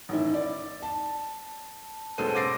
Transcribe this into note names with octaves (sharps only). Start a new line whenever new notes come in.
A1 D#3 E4
D5
A5
B2 G#3 C#4 A4 C5 D#7
D6 E6 A6 A#6 C7 D7